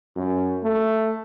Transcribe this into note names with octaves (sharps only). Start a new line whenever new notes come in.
F#2
A3